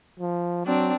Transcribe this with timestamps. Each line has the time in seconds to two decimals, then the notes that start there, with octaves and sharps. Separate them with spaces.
0.19 F3
0.66 F#3 C4 D4